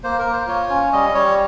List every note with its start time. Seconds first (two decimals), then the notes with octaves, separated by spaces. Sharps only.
0.04 A#3 C5
0.19 A#4
0.25 A#3
0.33 C5
0.47 F4 C#5
0.70 C#4
0.93 G3 D#5
1.14 G3 C#5